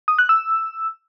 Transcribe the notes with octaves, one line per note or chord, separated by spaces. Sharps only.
D#6
F#6
E6